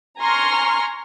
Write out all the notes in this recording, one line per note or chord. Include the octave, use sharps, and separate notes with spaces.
G#5 A#5 C6 C#6 F6